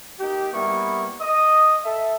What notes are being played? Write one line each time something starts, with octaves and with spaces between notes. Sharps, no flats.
A#3 D#4 G4
G3 A#3 B3 E4 C#6
D#5 D#6
A4 E5